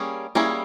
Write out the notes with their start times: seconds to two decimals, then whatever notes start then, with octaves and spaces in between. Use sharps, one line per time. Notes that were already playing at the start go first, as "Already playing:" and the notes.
Already playing: G3 A#3 C#4 G#4
0.35 G3 A#3 C#4 E4 G#4